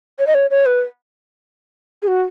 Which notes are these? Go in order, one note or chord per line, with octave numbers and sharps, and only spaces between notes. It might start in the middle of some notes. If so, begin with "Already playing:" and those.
C#5
D#5
C#5
C#5
B4
G#4
F#4